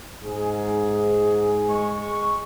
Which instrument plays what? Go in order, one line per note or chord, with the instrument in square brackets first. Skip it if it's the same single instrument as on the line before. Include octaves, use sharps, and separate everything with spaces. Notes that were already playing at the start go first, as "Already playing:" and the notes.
[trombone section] G#2 G#4
[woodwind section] G#3 C#6